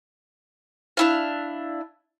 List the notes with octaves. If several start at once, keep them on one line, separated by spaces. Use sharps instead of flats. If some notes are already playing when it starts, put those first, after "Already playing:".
D4 E4 F5